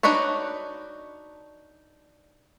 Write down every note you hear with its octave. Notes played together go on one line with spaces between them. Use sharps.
D4 D#4 F#4 B4 C#5